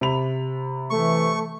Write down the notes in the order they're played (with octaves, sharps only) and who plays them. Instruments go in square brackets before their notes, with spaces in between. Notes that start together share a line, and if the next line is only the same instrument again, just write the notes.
[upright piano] C3 B5 F7
[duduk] E3 [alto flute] A3 [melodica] C#6